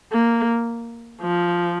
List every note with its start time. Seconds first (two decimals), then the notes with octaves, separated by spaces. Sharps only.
0.12 A#3
1.22 F3